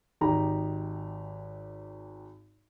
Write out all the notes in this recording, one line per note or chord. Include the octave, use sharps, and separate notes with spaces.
G#1 D#4 G4 A#5